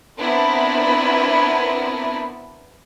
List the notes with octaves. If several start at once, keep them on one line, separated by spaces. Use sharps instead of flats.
B3 C4 D4 E4 A#4 B4